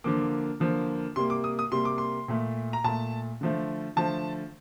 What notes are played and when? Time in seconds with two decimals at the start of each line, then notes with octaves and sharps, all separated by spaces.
0.04 D3 F3 A#3 D6
0.60 D3 F3 A#3
1.16 C3 G3 A#3 C6
1.30 D6
1.44 D#6
1.59 D#6
1.72 C3 G3 A#3 C6
1.85 D6
1.98 C6
2.28 A#2 A3
2.73 A#5
2.84 A#2 A3 A5
3.41 D3 F3 A3
3.96 D3 F3 A3 A5